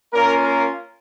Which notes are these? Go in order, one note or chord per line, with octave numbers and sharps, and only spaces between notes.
A#3 C#4 F4 A#4
A#4